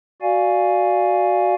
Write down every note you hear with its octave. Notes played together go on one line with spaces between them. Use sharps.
F#4 D5 F5 G#5